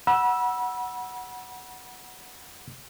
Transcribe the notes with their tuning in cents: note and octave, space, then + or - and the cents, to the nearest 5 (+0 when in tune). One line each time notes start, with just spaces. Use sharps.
F#5 +0 B5 -35 E6 +0